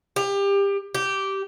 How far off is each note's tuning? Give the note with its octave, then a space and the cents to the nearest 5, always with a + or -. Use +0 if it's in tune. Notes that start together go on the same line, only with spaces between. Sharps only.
G4 +25
G4 -10